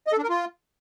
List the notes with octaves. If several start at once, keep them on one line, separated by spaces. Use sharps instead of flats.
D#5
A4
D4
A#4
F4